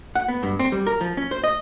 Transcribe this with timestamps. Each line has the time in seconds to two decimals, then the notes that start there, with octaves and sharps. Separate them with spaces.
0.15 F#5
0.28 B3
0.43 G2
0.59 C4
0.72 G3
0.87 A#4
1.01 F3
1.17 C#4
1.31 C5
1.44 D#5